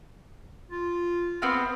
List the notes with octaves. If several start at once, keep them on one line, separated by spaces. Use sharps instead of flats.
F4
B3 C4 F5 C6